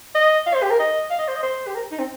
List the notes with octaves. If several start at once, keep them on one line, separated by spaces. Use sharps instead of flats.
D#5
F5
C5
G4
A#4
D#5
F5
D#5
C5
D#5
C5
G4
A#4
D#4
C4